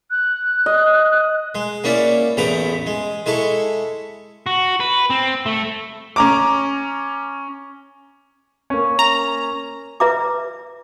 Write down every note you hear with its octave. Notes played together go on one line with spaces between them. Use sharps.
F#6
D#5
G#3
A#3 C#4 E4 D5
A1 E2 B3 A#5 D6
G#3
G#3 E4 A4 C#6
F#4
B4
C4
A3
C#4 A#5 D6
A#3 C#4
A#5
B4 E5 A#5 D6